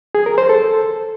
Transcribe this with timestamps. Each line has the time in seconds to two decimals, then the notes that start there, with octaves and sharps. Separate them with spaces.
0.15 G#4
0.26 A#4
0.38 C5
0.49 A4